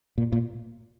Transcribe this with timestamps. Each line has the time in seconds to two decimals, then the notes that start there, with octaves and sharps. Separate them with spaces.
0.18 A#2
0.32 A#2